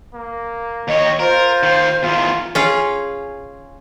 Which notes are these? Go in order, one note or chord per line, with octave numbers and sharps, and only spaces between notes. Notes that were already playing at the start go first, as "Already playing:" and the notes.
A#3
D#2 C#5 D#5
F4 A#4 C5
D#3 F5
E2 D#3 F4
C#4 F4 G#4